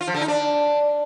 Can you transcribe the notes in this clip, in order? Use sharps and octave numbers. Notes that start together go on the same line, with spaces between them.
F4
F3
D3
D#4
D4